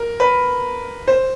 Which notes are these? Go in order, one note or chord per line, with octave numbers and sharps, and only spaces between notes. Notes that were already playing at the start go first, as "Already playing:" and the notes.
Already playing: A#4
B4
C5